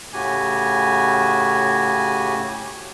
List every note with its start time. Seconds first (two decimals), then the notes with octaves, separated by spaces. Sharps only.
0.13 A2 C#3 F#4 G4 G#5